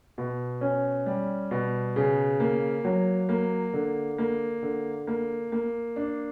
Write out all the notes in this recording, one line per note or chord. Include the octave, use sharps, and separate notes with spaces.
B2
C#4
G3
B2
C#3
A#3
F#3
A#3
D3
A#3
D3
A#3
A#3
D4